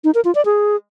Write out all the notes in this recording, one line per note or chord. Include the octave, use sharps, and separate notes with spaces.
D#4
A#4
F4
D5
G#4